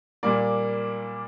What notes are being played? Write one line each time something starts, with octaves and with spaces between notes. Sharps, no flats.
A#2 G3 A#3 D5